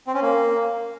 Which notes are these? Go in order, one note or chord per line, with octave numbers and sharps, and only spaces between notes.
C4
C#4
A#3